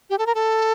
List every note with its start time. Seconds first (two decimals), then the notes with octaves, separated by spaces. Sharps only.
0.10 G4
0.18 A4
0.26 A#4
0.35 A4